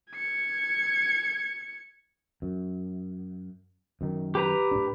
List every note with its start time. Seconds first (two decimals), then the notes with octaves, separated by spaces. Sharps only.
0.13 G#6 C#7
2.42 F#2
4.01 F#2 D#3
4.35 G4 B4 A#5
4.71 A2 D4